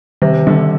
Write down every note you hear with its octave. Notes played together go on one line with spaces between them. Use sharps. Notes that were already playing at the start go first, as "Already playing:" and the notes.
C3 D#3
D3 G3